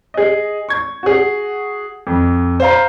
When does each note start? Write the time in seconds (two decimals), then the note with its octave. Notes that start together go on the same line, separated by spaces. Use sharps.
0.14 G#4 D#5
0.69 C#6 G#6
1.03 F#4 G#4
2.07 F2
2.60 C5 F5 A#5